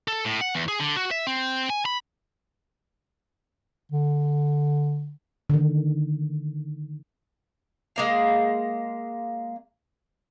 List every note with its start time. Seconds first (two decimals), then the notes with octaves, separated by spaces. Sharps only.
0.08 A4
0.25 A2
0.41 F#5
0.55 E2
0.68 G#4
0.80 D3
0.96 F#4
1.11 E5
1.27 C4
1.70 G#5
1.86 B5
3.92 D3
5.50 D3 D#3
7.96 G#3 A#3 F5